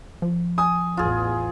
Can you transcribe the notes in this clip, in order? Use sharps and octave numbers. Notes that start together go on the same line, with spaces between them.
F3
G#5 D#6
A1 E2 F4 G#4